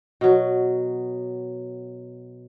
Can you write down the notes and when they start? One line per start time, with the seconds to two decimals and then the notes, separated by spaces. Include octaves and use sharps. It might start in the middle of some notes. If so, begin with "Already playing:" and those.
0.21 B2 F#3